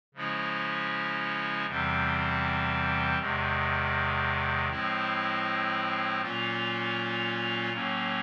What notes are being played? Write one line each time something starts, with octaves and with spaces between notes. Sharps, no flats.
C#3 F3 G#3 C#4 E4
E2 C3 E3 G3 C4
E2 C3 D#3 G#3
A2 F3 G#3 C4 E4
A#2 F#3 A#3 C#4 F4
A2 F#3 A#3 C#4